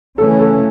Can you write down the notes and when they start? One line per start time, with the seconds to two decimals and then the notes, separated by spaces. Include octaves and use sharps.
0.18 C#3 E3 A3 C#4 A4
0.39 A4